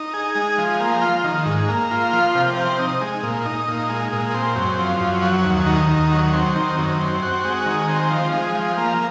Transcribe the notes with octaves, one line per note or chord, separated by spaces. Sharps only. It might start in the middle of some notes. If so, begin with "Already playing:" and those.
Already playing: D#4
G#4
G#3
F3
A#3
F4
D#3
G#2
A#3
F4
F3
C3
C4
D#4
G#3
A#2
D#4
A#2
G#3
A#2
C4
F#2
F3
F#2
F#3
D#2
D#3
D#2
F#3
C4
D#3
F#2
C4
F#4
G#3
D#3
C4
F3
G#3
F3
A#3